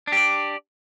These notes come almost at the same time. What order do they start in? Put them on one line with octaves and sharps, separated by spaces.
D4 G4 D5